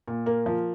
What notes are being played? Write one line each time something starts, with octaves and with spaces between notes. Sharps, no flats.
A#2
A#3
F3